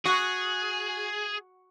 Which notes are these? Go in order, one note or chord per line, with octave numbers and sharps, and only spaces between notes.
F#4 G#4